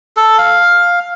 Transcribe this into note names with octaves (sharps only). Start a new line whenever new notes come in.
A4
F5